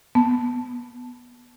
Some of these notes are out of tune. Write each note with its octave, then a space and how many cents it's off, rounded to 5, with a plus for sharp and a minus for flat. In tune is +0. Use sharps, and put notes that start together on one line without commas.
B3 +0 A5 +0